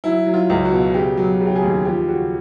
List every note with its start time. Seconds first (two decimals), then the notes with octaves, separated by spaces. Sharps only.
0.04 F#3 E4
0.27 F#3
0.34 F4
0.50 C#2
0.65 F#4
0.72 B2
0.94 C#3 G4
1.17 F#3
1.40 C#3
1.47 G4
1.56 G#4
1.63 D#2
1.85 F3 G4
2.08 C#3 F#4